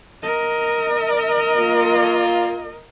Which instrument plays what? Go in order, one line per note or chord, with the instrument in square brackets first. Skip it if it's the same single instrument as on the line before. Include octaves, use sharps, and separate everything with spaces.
[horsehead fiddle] A#4 D#5
[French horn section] A#3 F4